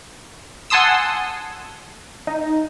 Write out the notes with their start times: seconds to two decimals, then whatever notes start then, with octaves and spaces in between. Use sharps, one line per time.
0.70 F#5 G#5 A5 C6 D#6 E6
2.27 D#4